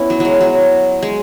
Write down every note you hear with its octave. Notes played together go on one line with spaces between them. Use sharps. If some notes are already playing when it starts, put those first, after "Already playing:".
Already playing: B3 C#4 E4
F#3
F#3 G#3
F#3
G#3